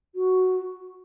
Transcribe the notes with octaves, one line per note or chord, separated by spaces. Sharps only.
F#4